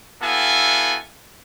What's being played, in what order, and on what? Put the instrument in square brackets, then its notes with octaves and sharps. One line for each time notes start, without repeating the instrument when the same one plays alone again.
[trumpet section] B3 E4 F#4 A4 F5 G#5